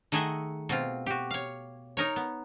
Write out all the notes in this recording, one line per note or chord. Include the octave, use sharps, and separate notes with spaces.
D#3 A3 G#4 D#5 E5 F#5
B2 C4 F4
F#4 G4
C#5 F5
D#4 A#4 C#5
B3